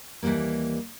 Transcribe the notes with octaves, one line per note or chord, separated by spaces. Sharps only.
D#2 E3 F#3 G3 A#3